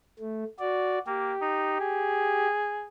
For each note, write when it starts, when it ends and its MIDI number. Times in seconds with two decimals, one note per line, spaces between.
0.19 0.44 57
0.59 0.99 66
0.59 0.99 74
1.07 1.33 58
1.07 2.47 67
1.41 1.76 63
1.80 2.87 68